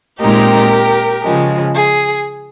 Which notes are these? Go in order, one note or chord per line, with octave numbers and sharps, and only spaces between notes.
A#2 G#3 C4 D#4 G4 A#4
C#3 F3 G#3
G#4